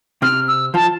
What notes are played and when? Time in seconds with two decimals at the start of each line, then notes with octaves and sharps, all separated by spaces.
0.22 C3 C4 F6
0.48 E6
0.74 F3 F4 A5